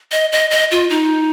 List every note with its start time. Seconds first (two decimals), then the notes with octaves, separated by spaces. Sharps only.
0.12 D#5
0.32 D#5
0.51 D#5
0.71 F4
0.90 D#4